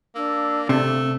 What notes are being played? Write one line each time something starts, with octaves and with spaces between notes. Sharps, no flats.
A#3 D4 E6
C3 A3